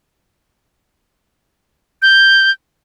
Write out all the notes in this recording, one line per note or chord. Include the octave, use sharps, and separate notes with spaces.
G6